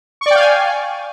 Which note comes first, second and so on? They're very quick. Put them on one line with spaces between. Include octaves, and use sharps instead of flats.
C#6 D5 G5 F5 G#5